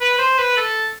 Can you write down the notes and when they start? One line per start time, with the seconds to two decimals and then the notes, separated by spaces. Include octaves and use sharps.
0.01 B4
0.19 C5
0.38 B4
0.57 A4